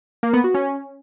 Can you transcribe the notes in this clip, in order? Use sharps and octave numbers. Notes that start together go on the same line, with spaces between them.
A#3
B3
F#4
C#4